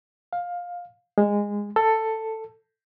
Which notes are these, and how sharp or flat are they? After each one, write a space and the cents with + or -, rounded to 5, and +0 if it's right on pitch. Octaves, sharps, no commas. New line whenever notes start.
F5 +15
G#3 -20
A4 +10